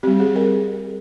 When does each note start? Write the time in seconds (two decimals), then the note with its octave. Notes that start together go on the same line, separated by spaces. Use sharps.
0.03 G3 C4 G4
0.20 G#4
0.36 A#4